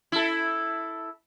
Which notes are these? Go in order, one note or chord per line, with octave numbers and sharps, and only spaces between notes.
E4 A4